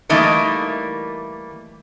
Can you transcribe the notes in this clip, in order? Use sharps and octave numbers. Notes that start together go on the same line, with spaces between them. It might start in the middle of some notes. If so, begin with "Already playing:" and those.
E3 G3 A3 A#3 D#4 A#4